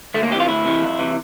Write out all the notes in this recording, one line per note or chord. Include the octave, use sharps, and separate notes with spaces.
D2 A3
A#3
C3 E3 G4
F4
D2 E4
C3 E3
F2
C3 E3